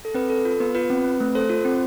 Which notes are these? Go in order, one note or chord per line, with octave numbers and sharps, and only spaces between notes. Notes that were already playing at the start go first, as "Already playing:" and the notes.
A4
C4 B4
A4
F4
B3 B4
F4 B4
C4
C4
A3
A4 C5
F4
C4